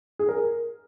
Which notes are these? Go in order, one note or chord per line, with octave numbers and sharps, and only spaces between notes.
G#4
A#4